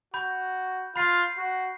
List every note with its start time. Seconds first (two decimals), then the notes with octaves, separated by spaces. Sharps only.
0.14 F#4 B5 G6
0.96 F4 B5 C7
1.38 F#4